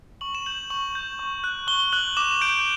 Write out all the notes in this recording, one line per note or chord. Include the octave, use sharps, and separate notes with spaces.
C#6 F#7
E7
G6 F#7
C#6 F#7
G6
C#6
F#6
C#6 G7
F#6 F#7
D6 E7
G6 D7